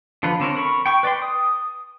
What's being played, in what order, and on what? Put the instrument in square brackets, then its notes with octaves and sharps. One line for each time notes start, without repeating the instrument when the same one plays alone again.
[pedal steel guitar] D3 F3 F4 B4
D3 C4 C#4 A#4
A#4 B5 C#6
G5 C#6
B4 D5 G5 C6
D#6